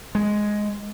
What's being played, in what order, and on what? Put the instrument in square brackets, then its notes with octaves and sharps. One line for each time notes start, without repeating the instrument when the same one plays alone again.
[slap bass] G#3